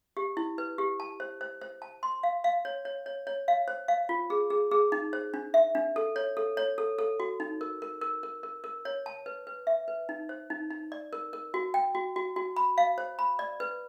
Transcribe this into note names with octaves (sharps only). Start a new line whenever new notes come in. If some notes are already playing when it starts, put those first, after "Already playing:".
G4
E4
B4
G4
A5
C5
C5
C5
A5
C6
F5
F5
C#5
C#5
C#5
C#5
F5
C5
F5
F4
G#4
G#4
G#4
D#4
C5
D4
E5
D4
A4
C#5
A4
C#5
A4
A4
F#4
D#4
A#4
A#4
A#4
A#4
A#4
A#4
C#5
A5
B4
B4
E5
B4
D#4
C5
D#4
D#4
D5
A#4
A#4
F#4
G5
F#4
F#4
F#4
B5
F5
C5
B5
D5
B4